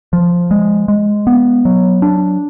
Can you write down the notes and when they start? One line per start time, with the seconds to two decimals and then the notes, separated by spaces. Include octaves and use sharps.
0.13 F3
0.51 G#3
0.88 G#3
1.27 B3
1.65 F#3
2.02 D4